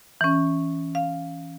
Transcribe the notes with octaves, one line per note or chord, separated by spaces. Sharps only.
E3 C#4
F5